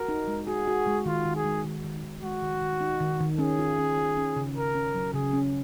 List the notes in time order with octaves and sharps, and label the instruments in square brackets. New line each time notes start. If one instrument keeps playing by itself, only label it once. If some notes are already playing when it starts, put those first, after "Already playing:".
Already playing: [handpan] F#4 [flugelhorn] A#4
[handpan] D#4
G#3
[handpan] F#4 [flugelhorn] G#4
[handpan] F#4
G#3
[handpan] D#3 [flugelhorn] F4
[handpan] D#3
[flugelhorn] G#4
[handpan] G#3
D#3
D#3
D#3
[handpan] G#3 [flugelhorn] F#4
[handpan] D#3
D#3
D#4
D#3
D#3
[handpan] C#4 [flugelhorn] G#4
[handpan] F4
C#4
F4
C#4
C#3
[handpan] C#3 [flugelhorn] A#4
[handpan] C#4
F#3
[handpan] C#3 [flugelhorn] G#4
[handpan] C#4